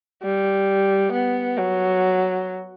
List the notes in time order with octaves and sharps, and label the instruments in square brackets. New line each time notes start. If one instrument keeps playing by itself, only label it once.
[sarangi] G3
B3
F#3